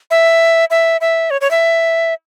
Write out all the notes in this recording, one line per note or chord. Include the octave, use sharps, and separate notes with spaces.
E5
E5
E5
C#5
C#5
E5